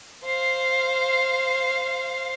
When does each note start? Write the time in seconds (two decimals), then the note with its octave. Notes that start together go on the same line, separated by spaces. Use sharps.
0.24 C5 F5